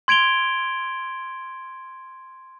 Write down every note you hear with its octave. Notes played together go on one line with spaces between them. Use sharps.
C6 G#6 D7 F7 G7